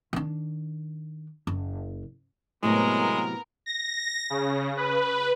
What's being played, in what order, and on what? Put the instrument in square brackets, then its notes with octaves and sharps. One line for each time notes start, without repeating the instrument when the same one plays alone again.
[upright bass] D#3 D4
F#1
[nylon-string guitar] A2 C3 F#3 [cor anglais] G#3 [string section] B3 A#4
[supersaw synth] A#6
C#3
B4